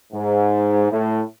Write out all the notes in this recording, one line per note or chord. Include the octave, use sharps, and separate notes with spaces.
G#2
A2